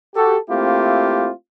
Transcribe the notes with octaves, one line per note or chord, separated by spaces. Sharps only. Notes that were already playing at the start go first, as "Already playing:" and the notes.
F#4 G4 A4
A3 A#3 C4 E4 F4 G4